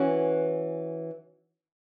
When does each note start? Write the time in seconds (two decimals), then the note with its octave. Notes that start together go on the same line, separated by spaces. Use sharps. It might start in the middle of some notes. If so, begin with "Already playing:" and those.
Already playing: E3 C#4 F#4